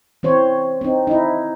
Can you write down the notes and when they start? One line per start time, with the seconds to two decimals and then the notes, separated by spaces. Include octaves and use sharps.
0.23 E3 C4 C5 C#5
0.81 C4 D#4
1.07 D#4 E4